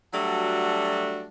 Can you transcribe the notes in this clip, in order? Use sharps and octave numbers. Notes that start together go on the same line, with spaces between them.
F#3 G3 A3 D4 F#4